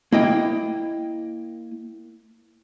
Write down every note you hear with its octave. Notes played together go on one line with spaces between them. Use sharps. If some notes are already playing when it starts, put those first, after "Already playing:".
A#3 E4 D#5 G5